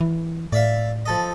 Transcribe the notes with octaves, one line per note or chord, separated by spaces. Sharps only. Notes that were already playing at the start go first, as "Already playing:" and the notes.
E3
A2 D5 E5 F5
F3 A4 D#5